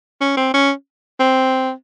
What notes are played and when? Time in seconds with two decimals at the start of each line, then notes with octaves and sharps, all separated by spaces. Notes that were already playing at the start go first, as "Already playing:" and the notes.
0.21 C#4
0.37 C4
0.54 C#4
1.20 C4